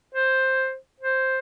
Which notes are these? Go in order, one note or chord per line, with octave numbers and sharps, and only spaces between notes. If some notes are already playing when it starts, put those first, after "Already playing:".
C5
C5